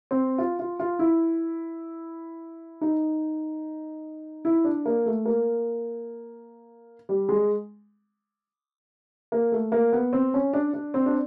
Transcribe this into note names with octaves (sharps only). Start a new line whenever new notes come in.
C4
F4
F4
F4
E4
D#4
E4
D4
A#3
A3
A#3
G3
G#3
A#3
A3
A#3
B3
C4
C#4
D4
D4
C4
D4